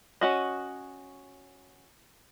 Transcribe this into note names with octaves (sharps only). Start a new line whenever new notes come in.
C#4 F#4 D#5